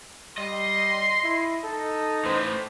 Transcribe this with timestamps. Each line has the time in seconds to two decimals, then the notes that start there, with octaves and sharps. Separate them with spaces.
0.38 G3 D#5 C6
1.24 E4
1.64 D#4 A4
2.25 A2 E3 C5